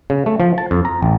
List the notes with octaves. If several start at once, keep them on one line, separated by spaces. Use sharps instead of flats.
C#3
A3
F3
A5
F2
A#5
A1